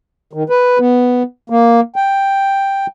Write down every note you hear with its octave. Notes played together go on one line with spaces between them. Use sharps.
D#3
B4
B3
A#3
G5